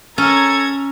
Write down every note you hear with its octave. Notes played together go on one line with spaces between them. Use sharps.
C#4 A4 A#5 G#6